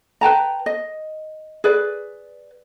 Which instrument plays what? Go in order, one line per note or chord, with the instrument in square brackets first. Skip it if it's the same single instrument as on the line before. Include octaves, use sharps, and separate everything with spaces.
[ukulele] B4 G5 A5 A#5
D#5
G#4 B4 D5